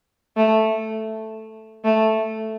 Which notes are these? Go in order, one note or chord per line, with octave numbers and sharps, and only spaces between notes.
A3
A3